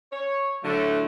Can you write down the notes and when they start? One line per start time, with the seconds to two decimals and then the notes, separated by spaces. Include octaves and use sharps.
0.13 C#5
0.64 A2 D3 F#3 A3